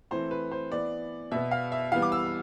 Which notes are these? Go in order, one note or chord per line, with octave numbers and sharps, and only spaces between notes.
E3 A3 C4 C5
B4
C5
E3 B3 D5
B2 B3 E5
F5
E5
E3 G3 B3 F5
D6
E6